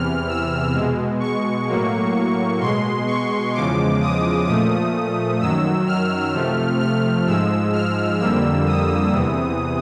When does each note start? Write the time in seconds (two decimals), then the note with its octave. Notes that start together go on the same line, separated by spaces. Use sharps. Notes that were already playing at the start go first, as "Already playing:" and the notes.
Already playing: E2 C3 E3 F6
0.28 E6
0.73 B2 G#3
1.20 C#6
1.67 A2 F#3 A#3
2.60 B2 G#3 C6
3.07 C#6
3.53 E2 C#3 F3 G#3 D6
4.01 D#6
4.47 A#2 F3 A3 D#6
5.40 F#2 D#3 F#3 E6
5.86 F6
6.33 C3 F3 A3
6.80 F6
7.26 G#2 F3 G#3 E6
7.73 F6
8.20 F2 D3 G3 A#3 E6
8.66 D#6
9.13 E2 C3 E3